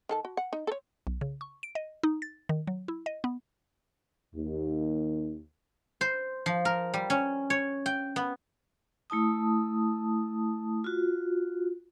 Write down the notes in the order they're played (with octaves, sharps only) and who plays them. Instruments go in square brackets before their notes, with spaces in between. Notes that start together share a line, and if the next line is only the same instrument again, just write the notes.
[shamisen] D#3 A4 A5
F#4
F#5
D#4
A4 C#5
[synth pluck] B1
C#3
C#6
D7
D#5
D#4
A6
D#3
F#3
E4
D#5
B3
[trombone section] D#2
[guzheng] C5
F3
A#4
G3
C#4
C#5
G5
B3
[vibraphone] A3 E4 A5 D#6
F4 F#4